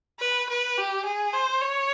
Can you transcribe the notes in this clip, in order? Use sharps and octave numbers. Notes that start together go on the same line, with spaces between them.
B4
B4
G4
G#4
C5
C#5